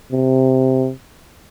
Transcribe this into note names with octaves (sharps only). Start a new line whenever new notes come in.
C3